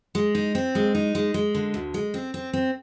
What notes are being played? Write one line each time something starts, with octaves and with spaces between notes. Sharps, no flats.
G#3
D#4
C4
G#3
D#4
G#3
G#3
D3
D2
G#3
C4
C4
C4